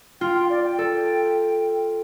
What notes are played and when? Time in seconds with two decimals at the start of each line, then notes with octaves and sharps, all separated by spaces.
0.21 F4 G5
0.35 G5
0.50 D5
0.64 G5
0.79 A4